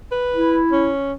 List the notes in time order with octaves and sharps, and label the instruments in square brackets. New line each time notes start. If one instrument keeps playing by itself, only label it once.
[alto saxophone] B4
[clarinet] E4
[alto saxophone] C#4